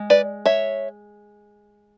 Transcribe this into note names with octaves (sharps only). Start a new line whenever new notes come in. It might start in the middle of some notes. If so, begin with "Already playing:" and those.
Already playing: G#3
B4 D5
C#5 E5